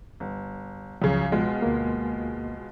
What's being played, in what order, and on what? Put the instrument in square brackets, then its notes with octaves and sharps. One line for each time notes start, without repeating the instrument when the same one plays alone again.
[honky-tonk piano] G1
[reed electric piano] C#2 F3 [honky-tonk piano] F#2 C#3
[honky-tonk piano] B2 G#3 F4
[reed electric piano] D2 A#3